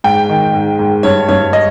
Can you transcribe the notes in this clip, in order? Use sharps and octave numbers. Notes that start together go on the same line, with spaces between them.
G#2 G5
D#3
G#2
G#2
G2 C#5
G2 C#5
D#5